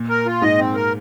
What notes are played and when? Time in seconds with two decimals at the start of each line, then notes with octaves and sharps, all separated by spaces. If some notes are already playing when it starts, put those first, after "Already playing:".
Already playing: A#2
0.09 A#4
0.26 F4
0.42 G#2 D#5
0.58 C4
0.75 A#4